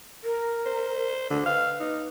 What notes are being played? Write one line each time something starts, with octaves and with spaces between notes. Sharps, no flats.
A#4
C5
D3
B4 F5
D#4